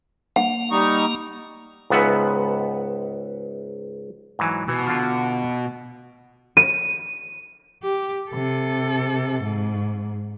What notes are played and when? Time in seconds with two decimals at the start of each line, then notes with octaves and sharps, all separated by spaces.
0.36 A#3 F#5
0.71 G3 D#4 C#6
1.90 C#2 G#2 B3 E5 F#5
4.39 G#2 E3 F#3
4.68 B2 E3
4.87 D3 F4
6.57 D#7
7.83 G4
8.30 C3 A4
9.43 G#2